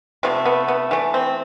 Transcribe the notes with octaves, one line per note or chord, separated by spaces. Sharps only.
C3 F3 A3 B3
B3
B3
E3 A3
C4